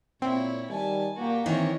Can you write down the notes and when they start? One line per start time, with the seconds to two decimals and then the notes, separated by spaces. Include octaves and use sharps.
0.22 A#2 C4 E4 C#5
0.70 D#3 G3 G#5 A5
1.17 A#2 A#3 F#4 G4
1.46 D#3 E3 C4 E4 A#4 C#5